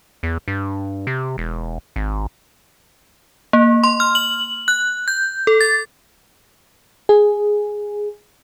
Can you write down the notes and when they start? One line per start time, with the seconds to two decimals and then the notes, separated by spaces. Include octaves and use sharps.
0.23 E2
0.48 G2
1.07 C3
1.38 E1
1.96 G#1
3.53 A#3
3.84 C6
4.00 F6
4.15 F#7
4.68 F#6
5.08 G6
5.47 A4
5.61 A6
7.09 G#4